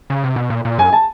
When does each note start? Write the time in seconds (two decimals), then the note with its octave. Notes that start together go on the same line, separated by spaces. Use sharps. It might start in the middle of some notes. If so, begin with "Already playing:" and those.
0.10 C#3
0.24 C3
0.36 B2
0.50 A#2
0.65 A#2
0.78 F#2 G#5
0.93 A5